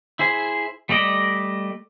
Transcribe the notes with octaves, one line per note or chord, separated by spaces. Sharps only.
E4 G#4 C5
G3 A3 D5 D#5